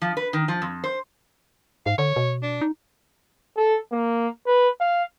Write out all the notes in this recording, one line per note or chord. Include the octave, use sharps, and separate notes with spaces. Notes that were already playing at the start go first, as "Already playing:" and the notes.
F3
B4
D#3
F3
F2
C5
G#2 F5
D3 C#5
B2
D4
D#4
A4
A#3
B4
F5